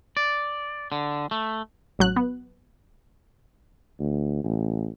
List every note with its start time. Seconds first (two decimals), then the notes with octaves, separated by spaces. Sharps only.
0.17 D5
0.92 D3
1.31 A3
1.99 A1 F#3 F#6
2.16 B3
4.00 D2
4.44 A1